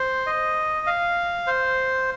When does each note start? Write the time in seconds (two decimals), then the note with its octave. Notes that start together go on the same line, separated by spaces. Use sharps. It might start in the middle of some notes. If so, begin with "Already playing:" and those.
Already playing: C5
0.27 D#5
0.87 F5
1.47 C5